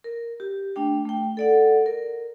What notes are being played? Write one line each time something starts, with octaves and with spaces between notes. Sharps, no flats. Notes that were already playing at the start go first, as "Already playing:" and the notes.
A#4
G4
A3 D4 G5
A3 G5
A4 D5 F#5
A#4